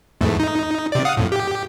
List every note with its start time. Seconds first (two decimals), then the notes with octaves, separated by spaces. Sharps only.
0.21 E2 G#2 A3
0.40 D#4
0.92 C3 D5
1.05 F5 F#5 D#6
1.17 F2 A2
1.32 G4